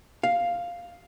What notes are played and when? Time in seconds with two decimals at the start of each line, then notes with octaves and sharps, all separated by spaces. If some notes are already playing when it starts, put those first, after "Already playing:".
0.23 F5